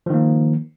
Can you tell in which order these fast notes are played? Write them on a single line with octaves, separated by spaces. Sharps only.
F3 D#3 A#3